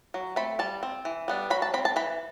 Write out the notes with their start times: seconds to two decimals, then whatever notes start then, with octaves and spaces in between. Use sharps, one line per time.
0.14 F#3
0.36 A3 C4 B5
0.59 G3 A5
0.83 C4
1.05 E3
1.28 G3 B3 D4
1.50 F#3 B5
1.62 A5
1.74 C4 B5
1.85 A5
1.96 E3 B5